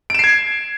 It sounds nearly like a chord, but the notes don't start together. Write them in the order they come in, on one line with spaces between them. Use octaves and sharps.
D7 E7 C7 G#6